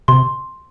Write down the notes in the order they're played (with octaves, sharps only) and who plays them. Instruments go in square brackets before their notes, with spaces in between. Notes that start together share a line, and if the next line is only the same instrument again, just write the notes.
[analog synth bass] C3 [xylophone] C6